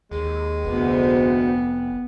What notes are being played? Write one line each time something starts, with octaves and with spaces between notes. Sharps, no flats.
D#2 G#3
F1 D2 B3